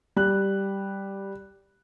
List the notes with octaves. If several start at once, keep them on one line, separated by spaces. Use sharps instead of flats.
G3 F#6